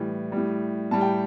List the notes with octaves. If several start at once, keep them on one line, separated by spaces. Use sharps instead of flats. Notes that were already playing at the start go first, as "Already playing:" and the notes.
Already playing: A2 E3 G3
A2 G3
A2 G3 A5
G5